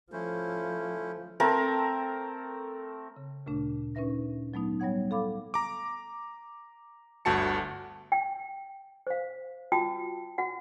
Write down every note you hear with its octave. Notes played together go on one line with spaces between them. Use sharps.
F3 A3 C#4 E4 C5
A3 C4 A4 A#4
C#3
D2 A#2 C#3 A3 D4
A#2 C#4 D#4 B4 E5 A#6
G#2 F#3 A3 B3 D#4
G3 B3 C#5 F#5 G#6
A4 F5 B5 D6
A#5 D6
G1 D2 F#4 A5 C#7
G5
C5 F5
F4 F#4 G5 A5 D#6
F#4 F#5